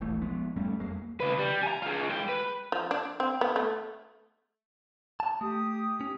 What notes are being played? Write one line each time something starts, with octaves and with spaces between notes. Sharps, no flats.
E1 A#1 E3 A3
F3 G#3 B3
G2 G3 A3 C#4
F2 F#3 G#3 A#3
C#3 B4
G3
G#5 A#5
F4 G#4
G#3 G5
B4
F3
D4
C4
B3
A3
A5
A3 G4 D#6
C#4